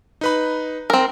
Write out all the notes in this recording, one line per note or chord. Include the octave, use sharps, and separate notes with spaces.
D#4 B4 B5
C4 A#4